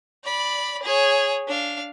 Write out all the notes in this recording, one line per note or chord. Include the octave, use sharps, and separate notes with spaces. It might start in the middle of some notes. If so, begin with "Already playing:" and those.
D5 B5
G#4 C#5
D4 F5